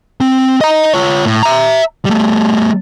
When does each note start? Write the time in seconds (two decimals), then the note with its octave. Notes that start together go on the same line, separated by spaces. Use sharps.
0.21 C4
0.61 D#5 A#5
0.94 F4 C#5
1.25 A2
1.43 E5 A#5
2.05 G3 A3